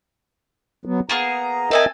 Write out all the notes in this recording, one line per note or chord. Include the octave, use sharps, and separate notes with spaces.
F#3 B3
A#3 B3 G#4 A#5
C4 A4 A#4 D#5 E5 G#5